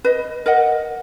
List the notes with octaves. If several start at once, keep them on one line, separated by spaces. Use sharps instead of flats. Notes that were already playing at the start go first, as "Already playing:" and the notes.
B4 D#5
A#4 D#5 F#5